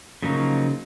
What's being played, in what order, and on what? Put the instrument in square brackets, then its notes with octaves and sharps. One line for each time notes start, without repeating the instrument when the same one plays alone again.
[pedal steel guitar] C#3 F3 F#3 A#3 D#4